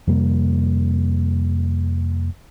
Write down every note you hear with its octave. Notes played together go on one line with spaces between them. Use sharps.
F2 C3 G3 A#3